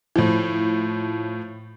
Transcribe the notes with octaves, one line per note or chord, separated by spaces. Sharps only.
A2 F3